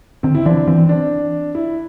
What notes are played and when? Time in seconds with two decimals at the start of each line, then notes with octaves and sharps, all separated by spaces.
0.23 D3 C4
0.35 E4
0.45 E3 D4
0.67 E3 C4
0.89 D4
1.55 E4